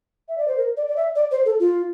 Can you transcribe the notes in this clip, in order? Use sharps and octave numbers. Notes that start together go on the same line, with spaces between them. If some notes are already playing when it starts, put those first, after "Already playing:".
E5
D5
C5
A#4
D5
D5
E5
D5
C5
A4
F4